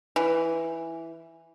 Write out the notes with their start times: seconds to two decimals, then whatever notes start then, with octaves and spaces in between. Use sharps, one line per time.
0.16 E3